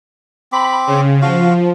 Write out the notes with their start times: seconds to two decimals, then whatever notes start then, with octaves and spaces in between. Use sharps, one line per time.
0.52 C4 B5 D6
0.87 C#3
1.22 F3 F#4 F5